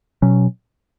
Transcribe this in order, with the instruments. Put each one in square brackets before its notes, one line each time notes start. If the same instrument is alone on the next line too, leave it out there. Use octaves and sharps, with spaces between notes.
[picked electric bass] B2 F#3 C#4